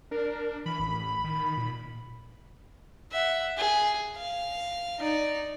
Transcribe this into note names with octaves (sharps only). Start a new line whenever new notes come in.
D4 A#4
E3 B5
A1
D#3
A#2
E5 F#5
G#4
F5
D#4 D5